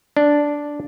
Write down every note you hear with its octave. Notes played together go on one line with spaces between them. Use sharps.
D4